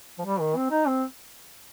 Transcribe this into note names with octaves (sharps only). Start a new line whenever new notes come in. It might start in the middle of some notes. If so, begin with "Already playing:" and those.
F3
G3
D#3
C4
D#4
C4